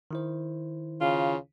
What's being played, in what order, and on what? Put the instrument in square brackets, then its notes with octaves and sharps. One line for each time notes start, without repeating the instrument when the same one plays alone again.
[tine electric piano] D#3 E4 C5
[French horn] C#3 [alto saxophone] F4